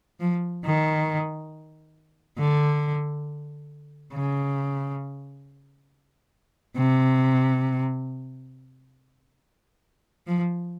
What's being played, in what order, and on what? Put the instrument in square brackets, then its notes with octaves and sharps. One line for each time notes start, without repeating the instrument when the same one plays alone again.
[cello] F3
D#3
D3
C#3
C3
F3